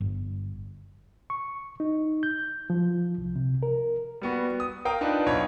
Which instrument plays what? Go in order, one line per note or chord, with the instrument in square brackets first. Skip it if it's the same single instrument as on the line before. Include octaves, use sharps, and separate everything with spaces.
[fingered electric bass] G1
[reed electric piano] C#6
D#4
G6
F3
C2
C3
A#4
[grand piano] G3 B3 F#4
D#6
A#4 F5 G5 A#5 D#6
D4 D#4 F4 B4
B1 C#5 B5